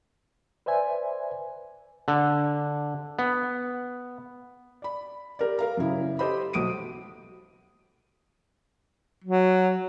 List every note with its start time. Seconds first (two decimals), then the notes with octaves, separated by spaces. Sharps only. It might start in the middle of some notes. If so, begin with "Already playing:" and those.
0.66 B4 C5 D5 E5 G#5
2.08 D3
3.19 B3
4.82 D5 B5
5.39 G4 A#4 D5
5.59 A#4 F5 A#5
5.77 F#2 C#3 E4
6.19 G4 A4 C5 D#5 B5
6.53 B1 D#6 D7 D#7
9.24 F#3